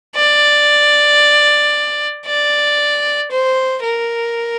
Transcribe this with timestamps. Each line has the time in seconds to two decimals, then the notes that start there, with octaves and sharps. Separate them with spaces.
0.15 D5
2.26 D5
3.31 C5
3.83 A#4